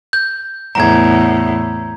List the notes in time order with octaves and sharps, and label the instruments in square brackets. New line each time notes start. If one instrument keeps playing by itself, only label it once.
[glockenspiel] G6
[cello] E2 A2 [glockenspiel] A#5 G#6